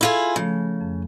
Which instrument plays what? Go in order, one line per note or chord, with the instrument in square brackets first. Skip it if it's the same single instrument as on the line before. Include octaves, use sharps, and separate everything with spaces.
[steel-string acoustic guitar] E4 F4 G#4 [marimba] A4
[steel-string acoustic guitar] C#3 [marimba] F3 A3
[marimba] F2